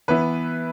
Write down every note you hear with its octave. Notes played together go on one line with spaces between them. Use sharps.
E3 B3 E4 B4